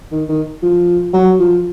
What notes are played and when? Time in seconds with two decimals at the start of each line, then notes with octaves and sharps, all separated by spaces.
0.11 D#3
0.29 D#3
0.62 F3
1.13 F#3
1.39 F3